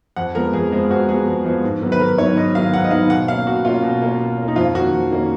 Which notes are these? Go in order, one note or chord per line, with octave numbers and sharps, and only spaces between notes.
F2 F#5
F3 G#3 B3 A#4
F2 G#4
F3 G#3 B3
F2 F#4
F3 G#3 B3 G#4
F2
F3 G#3 B3
G#2
D#3 F#3 B3
B4
G#2 A#4
D#3 F#3 B3 C#5
G#2 D#5
D#3 F#3 B3 F5
G#2 F#5
D#5
D#3 F#3 B3 F5
B2 F#5
A#3 C#4 F5
B2 F#4
A#3 C#4 F4
B2
A#3 C#4
B2
A#3 C#4
D#4
F2 F4
D#3 A#3 C#4 F#4
F2
D#3 A#3 C#4